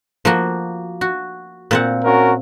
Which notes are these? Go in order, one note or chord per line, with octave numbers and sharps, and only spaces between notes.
F3 A#3 F#4
F#4
A#2 C4 F#5
C#4 F#4 A#4